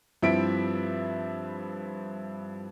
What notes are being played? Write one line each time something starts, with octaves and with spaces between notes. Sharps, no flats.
G2 F3 C4 E4 E5 D7